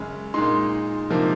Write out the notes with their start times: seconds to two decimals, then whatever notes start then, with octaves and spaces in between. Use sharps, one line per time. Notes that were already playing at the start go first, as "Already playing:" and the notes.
Already playing: F#2 C#3 G#3 C#4
0.34 A#2 G#3 D#4 C6
1.10 C3 F3 A#3 D#4